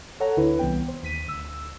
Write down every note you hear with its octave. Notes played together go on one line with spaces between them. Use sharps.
A4 C#5 F#5 A#5
D2 D3 E4 B4
C2 E3 B3 G5
C5
D#2 B6 D#7
D2 E6